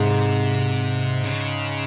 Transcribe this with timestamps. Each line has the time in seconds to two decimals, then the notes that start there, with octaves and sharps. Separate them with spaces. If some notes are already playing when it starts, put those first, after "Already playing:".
Already playing: G#2 C3
1.24 C#3